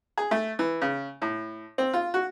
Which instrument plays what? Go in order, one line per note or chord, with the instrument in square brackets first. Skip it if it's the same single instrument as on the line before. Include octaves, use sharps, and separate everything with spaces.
[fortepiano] G#4
A3
E3
C#3
A2
C4
F4
F#4